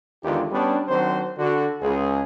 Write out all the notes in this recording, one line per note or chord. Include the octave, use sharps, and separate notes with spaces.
E2 D3 D#3 G#3 F4 G4
G3 B3 C#4 D4
D#3 F#3 C4 D4 F#4 C5
D3 F#4
C#2 G#4